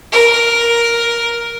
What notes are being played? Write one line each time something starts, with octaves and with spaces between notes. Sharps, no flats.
A#4